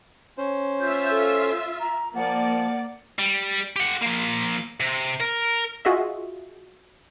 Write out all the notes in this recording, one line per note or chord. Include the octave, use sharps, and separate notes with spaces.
C#4 C5
F4 E5 G6
A4
A#5
F3 A#3 D5 F#5
G3
G4 F#5
F3 A#3
C3
A#4
F4 F#4 G#4 D#5 E5